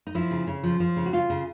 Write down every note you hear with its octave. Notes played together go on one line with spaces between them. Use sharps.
D#4
F3 E4
C#3
C#3
F3
F3
C#3
F#4
C#3 F4
C#3